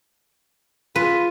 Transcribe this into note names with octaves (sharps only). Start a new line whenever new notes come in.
F4 B4